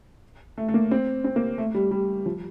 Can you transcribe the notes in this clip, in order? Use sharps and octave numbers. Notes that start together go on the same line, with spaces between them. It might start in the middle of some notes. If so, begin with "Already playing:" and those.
A3
A3
A#3
C4
C4
A#3
A3
G3
G3
F3